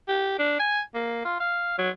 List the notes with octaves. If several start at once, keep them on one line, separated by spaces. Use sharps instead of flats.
G4
D4
G#5
A#3
F4
F5
F#3